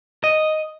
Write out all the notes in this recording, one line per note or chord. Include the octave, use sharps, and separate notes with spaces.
D#5